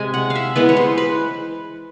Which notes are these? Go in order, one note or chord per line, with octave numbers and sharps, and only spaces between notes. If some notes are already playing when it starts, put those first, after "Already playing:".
Already playing: C3 G#3 G#5
F#5
F5
E5
E3 G#3 B3 B4
C#5
C5
B4